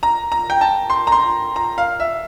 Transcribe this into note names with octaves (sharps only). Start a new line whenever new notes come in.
A#5
A#5
G5
A5
C6
A#5
C6
A#5
F5
E5